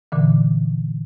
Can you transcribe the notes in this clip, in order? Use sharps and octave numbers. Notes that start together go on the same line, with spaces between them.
A#2 D3 E3